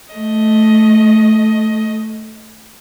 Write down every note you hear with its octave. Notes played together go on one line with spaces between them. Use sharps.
A3 D#5